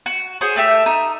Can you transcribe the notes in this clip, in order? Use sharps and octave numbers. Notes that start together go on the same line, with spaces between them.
F#4
F#4 G#4 C5 C#5
A3 G4 E5
D#4